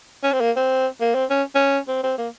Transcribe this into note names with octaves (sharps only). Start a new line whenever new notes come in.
C#4
C4
A#3
C4
A#3
C4
C#4
C#4
C4
C4
A#3